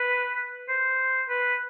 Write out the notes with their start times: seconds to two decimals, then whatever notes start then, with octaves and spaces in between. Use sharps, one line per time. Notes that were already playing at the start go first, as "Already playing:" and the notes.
Already playing: B4
0.69 C5
1.29 B4